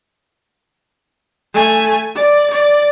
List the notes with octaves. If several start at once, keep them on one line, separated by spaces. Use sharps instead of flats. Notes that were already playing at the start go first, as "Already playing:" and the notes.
A3 G#5
D5
D5